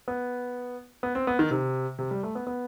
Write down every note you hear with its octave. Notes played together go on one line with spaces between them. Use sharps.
B3
B3
C4
B3
D#3
C3
C3
G3
A3
B3
B3